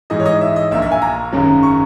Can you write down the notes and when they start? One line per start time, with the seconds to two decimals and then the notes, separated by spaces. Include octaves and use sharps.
0.10 G#2 E3 G#3 D#5
0.20 C#5
0.26 D#5
0.41 E5
0.56 D#5
0.71 A#1 A#2 A#3 E5
0.82 E5
0.92 G#5
1.02 A#5
1.33 G#1 F#2 C#3 F#3
1.63 C#6